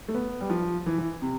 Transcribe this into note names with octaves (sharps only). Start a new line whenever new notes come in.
A3
B3
G3
F3
E3
E3
C3